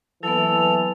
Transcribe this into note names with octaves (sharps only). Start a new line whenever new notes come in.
E3 F#3 A#3 B3 A4 F7